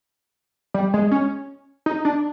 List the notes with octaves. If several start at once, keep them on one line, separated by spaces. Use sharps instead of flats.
G3
G#3
C#4
D#4
D4